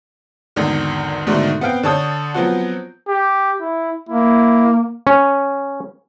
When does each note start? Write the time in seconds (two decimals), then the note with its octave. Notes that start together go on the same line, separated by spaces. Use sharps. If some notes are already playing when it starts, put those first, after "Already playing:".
0.56 G#1 E2 D3 D#3
1.27 G#2 B2 D3 D#3 A3
1.61 B3 C4 F5 G5
1.83 D3 C#5 A5 D#6 G6
2.34 F3 F#3 B3 C4 F4 F#4
3.08 G4
3.61 E4
4.09 A#3 E4
5.07 C#4